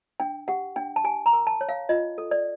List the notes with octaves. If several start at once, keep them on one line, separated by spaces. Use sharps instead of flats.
D4 G5
G4 F#5
D4 G5
A5
G4 G#5
A#5
A#4
A5
C#5
F5
F4 D#5
A4
D5